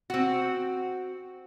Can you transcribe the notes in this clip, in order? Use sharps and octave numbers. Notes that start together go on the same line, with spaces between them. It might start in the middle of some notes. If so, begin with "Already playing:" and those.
C4 F#4